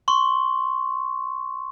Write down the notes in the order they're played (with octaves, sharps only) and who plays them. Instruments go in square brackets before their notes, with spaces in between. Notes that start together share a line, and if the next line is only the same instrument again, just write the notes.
[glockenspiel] C6 C#6